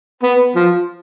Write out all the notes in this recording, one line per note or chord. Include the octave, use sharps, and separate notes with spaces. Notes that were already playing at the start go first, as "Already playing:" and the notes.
B3
F3